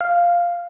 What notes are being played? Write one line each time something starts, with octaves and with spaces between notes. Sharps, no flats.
F5